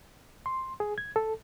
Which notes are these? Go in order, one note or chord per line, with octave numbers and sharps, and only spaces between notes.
C6
G#4
G#6
A4